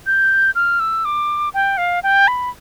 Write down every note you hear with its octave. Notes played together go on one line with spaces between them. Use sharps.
G6
F6
E6
D6
G5
F5
G5
B5